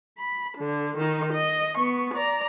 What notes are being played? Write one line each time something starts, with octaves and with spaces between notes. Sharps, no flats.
B5
D3
D#3 D#4
D#5
B3 C#6
D5 A#5